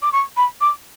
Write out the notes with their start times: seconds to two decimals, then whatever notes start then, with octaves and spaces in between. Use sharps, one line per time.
0.02 D6
0.12 C#6
0.37 B5
0.61 D6